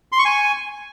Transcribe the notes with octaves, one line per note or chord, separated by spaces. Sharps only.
C6
C#6
G#5